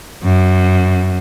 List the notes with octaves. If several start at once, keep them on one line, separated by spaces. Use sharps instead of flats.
F#2